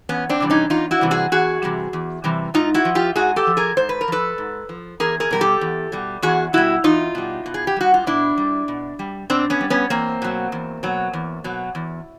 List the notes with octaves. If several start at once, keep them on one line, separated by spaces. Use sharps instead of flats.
E2 B3 C#4
C4 D4
C3 E3 G3
C#4 D#4
E2 D#4 F4
E4 F#4
C3 E3 G3
F#4 G#4
E2 F#4 G#4
C3 E3 G3
E2
C3 E3 G3
G#2 D#4 F4
E4 F#4
F3
F4 G4
G#2 F#4 G#4
G4 A4
F3
G#4 A#4
G#2 C5
B4
A#4
F3 A4 B4
G#2
F3
E2 G#4 A#4
G#4 A#4
B2 G3 A#4
G4 A4
E2
B2 G3
E2 F#4 G#4
B2 G3 E4 F#4
E2 D#4 F4
B2 G3
B2
G#4
G4
G3 F#4
F4
B2 D4 E4
G3
B2
G3
B2 C4 D4
B3 C#4
G3
B3 C#4
E2 A#3 C4
B2 F#3
E2
B2 F#3
E2
B2 F#3
E2